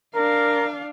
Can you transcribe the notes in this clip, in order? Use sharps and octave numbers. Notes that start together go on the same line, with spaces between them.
D4 A#4 F5